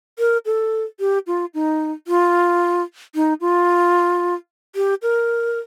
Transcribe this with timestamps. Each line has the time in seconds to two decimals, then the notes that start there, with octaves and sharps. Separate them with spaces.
0.19 A#4
0.46 A4
1.00 G4
1.27 F4
1.54 D#4
2.07 F4
3.15 D#4
3.41 F4
4.76 G4
5.02 A#4